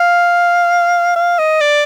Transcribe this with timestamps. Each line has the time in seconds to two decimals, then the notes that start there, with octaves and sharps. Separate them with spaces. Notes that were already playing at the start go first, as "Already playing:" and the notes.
Already playing: F5
1.16 F5
1.39 D#5
1.61 D5